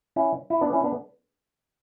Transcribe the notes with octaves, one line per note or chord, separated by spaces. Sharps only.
C#4 E4
E4
B3 D4
C#4 E4
B3 D4